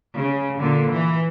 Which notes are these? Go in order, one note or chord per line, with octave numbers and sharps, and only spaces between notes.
C#3
A#2 D3
E3